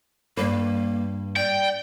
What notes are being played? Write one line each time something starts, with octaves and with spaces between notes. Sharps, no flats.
G2 A#3 B4
D5 G5